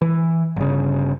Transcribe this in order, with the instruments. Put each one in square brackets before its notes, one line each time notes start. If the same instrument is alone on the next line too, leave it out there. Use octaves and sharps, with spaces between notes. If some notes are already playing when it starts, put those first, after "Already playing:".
[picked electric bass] E3
G1 C#3